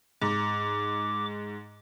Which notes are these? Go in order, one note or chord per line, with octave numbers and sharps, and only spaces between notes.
G#2 D6